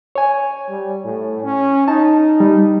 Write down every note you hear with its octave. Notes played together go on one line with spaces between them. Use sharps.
C#5 G#5
G3
A2
C#4
D#4 A5
G3